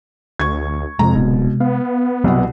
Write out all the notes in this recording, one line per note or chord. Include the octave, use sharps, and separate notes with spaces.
D2 C#6 G#6
F2 C3 G#3 A#5
D1 B2
B3 F5
C2 B2 F#3 G3 B3 F#5